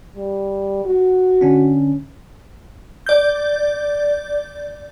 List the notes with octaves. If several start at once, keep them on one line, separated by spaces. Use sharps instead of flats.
G3
F#4
D3 C#4 D4
D5 G6